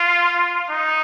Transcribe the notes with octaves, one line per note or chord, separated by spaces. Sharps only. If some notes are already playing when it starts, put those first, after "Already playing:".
Already playing: F4
D#4